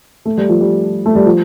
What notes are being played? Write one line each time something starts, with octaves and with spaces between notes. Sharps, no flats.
A3
G3
F3
G3
A3
G3
F3